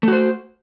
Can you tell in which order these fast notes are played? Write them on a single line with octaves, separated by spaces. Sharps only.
A3 F#4 C5